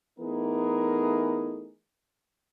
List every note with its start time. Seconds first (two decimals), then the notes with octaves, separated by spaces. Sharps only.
0.19 E3 A3 B3 D#4 G#4 A#4